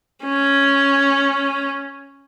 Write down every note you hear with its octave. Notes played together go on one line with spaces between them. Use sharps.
C#4